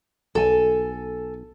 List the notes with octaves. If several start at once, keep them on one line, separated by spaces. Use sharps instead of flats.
B1 A4 G#5